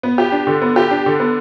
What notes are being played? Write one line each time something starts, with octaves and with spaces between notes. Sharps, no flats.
B3
G4
D4
D3
B3
G4
D4
D3
B3